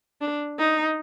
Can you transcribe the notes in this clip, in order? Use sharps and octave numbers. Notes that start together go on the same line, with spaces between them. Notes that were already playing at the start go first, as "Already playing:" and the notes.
D4
D#4